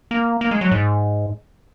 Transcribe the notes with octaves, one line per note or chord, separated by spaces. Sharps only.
A#3
A#3
G#3
F#3
G#2